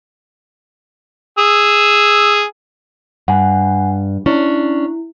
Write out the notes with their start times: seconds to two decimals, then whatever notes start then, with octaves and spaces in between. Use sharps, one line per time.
1.38 G#4 E6
3.28 G2 F#5 G#5
4.26 C#4 D4 E4